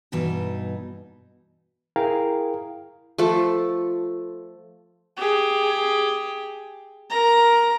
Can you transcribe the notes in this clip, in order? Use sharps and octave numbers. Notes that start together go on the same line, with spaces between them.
G2 B2 E3 D#4
E4 G#4 A#4 F5 G5 A#5
F3 A3 A4
G4 G#4
A#4 A#5